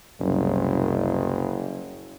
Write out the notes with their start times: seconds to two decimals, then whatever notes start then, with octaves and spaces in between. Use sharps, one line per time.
0.20 F#1 C2 F#2